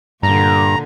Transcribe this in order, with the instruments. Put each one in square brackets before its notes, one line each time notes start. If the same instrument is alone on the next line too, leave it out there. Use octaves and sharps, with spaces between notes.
[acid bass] G2 [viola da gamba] A#2 D3 [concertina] A#5